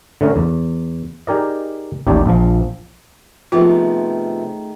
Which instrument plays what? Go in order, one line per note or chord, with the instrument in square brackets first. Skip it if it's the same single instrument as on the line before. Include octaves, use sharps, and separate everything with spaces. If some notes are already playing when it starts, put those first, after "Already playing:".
[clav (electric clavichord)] D3 A3 C#4 A#4
E2
D#4 G4 G#4 A#4 D5 D#5
A1 D#2 D#4 G4 D5 A5
A#1 F3
[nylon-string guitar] C3 F3 B3 [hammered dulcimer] D#3 [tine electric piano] A3 G#4 [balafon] F4